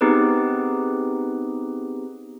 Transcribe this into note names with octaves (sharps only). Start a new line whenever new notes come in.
B3 C4 D#4 G4 G#4 B4